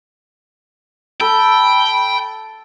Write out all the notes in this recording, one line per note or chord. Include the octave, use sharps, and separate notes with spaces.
A4 G5 B5